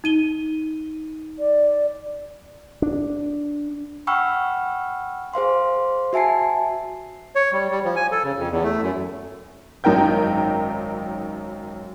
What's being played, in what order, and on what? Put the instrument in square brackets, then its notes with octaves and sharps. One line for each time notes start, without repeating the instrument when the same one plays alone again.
[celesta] D#4 D#7 G7
[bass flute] D5
[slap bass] D4
[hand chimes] F#5 G5 B5 C#6 E6 F6
G#4 C5 F5 C6
F#4 E5 G#5 A5 C7
[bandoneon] C#5
G3
G3
F3
G#5
A4
C#3
F2
E2
A3
F#2
[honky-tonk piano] G#1 F#2 D#4 A#4 G5 G6